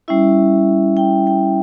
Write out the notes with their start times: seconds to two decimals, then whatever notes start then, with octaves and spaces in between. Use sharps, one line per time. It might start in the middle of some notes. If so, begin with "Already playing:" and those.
0.08 G3 C#4 E4 E5
0.97 G5
1.27 G5